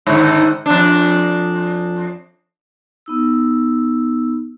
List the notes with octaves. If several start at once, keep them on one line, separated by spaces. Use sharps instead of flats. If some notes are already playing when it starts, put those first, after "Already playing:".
G#2 D3 D#3
F2 D4
B3 D#4 E6